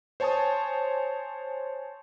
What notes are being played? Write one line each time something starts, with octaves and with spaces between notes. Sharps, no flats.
C5 C#5 G#5 A5 C#6 D#6